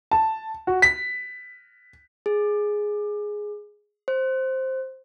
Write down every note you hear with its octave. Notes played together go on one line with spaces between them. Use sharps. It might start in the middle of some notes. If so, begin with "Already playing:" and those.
A5
F#4
B6
G#4
C5